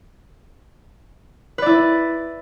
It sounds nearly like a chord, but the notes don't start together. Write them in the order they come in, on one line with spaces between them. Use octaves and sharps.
B4 D5 E4